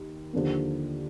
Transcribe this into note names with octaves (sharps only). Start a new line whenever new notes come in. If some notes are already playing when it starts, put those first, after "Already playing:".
Already playing: D#2
D#2 D3 F3 A#3